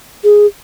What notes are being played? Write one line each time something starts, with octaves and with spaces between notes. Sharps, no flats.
G#4